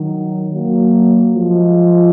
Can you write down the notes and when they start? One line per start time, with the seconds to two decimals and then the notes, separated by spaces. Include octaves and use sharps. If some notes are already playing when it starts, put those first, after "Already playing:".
Already playing: D#3 F#3
0.53 F#3 A#3
1.34 F3 G#3